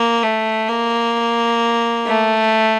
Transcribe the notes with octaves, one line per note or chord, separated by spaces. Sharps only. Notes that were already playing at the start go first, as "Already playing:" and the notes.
Already playing: A#3
A3
A#3
A3